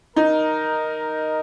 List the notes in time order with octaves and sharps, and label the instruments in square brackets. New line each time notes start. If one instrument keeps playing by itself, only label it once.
[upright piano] D#4 [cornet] A#4